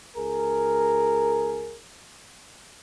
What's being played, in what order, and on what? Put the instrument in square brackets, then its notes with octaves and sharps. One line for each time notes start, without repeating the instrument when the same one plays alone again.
[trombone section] C#2 G#4 A#4